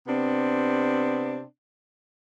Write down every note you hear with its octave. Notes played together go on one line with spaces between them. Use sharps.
C3 B3 C4 D4